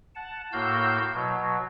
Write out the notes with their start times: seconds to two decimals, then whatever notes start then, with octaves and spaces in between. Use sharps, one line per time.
0.15 F#5 A5
0.53 A2 A#3 F#4 F5 E6 G6
1.13 B2 F#3